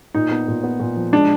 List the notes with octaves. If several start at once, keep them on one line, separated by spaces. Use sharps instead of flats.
A#2 D#4
B3
A#2
B3
A#2
F3
G#3 D4